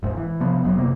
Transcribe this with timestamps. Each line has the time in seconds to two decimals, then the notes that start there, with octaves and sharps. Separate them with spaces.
0.03 E1 G#2
0.17 E3
0.40 C3 F3 B3
0.64 F1 F#3 B3
0.78 F#1 C3 A#3